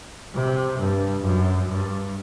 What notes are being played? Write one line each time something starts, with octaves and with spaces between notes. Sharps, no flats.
C3
G2
F#2
G2